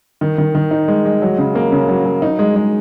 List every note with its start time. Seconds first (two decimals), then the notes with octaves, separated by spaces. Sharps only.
0.21 D#3
0.38 D#3
0.55 D#3
0.71 D#4
0.88 G#3
1.05 G#3
1.22 F#3
1.38 C#3
1.55 A#3
1.72 C#3
1.89 F#3
2.05 F#3
2.22 D#4
2.39 G#3
2.56 G#3